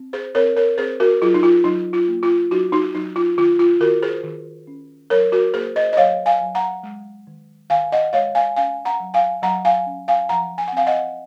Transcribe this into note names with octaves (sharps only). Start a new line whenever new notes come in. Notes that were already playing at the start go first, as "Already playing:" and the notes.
Already playing: C4
G#4 C5
C4 A#4 C#5
A#4 C#5
C4 G#4 C5
F#4 A#4
F#3 F4 G#4
D#4
F4
F#3 D#4
F4
A#3
F4
F#3 D#4 F#4
D#4 F#4
F#3 D#4
F4
D#3 F4
F4
D#3 F#4 A#4
G#4 C5
D#3
C#4
F#3 A#4 C#5
F#4 A#4
A#3 G#4 C5
C5 D#5
D#5
F#3 C#5 F5
F5 G#5
F#3
F#5 A#5
G#3
D#3
D#3 F5 G#5
D#5 F#5
G#3 C#5 F5
F5 G#5
C#4 F5 G#5
F#5 A#5
F#3
F5 G#5
F#3 F#5 A#5
F5 G#5
C#4
F5 G#5
F3 F#5 A#5
G#5
F#5
C4 F5 G#5
D#5 F#5